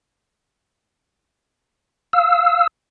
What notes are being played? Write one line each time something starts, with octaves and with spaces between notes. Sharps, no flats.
F5 E6